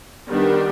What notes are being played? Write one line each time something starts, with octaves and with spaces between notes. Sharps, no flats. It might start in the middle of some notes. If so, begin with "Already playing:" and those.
D#3 G3 B3 D4 G4